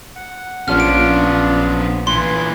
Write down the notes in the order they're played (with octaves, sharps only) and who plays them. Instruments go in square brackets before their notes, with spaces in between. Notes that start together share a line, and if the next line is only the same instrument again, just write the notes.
[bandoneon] F#5
[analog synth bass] A#1 [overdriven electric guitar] B3 C#4 [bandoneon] D4 F4 [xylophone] F6
[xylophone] D7
[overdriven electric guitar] A#2 E3 [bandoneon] B4 [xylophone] C6